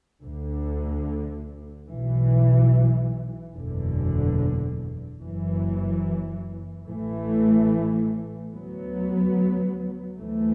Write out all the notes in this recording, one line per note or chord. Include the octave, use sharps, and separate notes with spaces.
D2 D3
B1 B2 E3
F#1 E2 B2 D3
F#1 F#2 E3
A1 A2 E3 A3
D2 F#3 B3
D2 E3 A3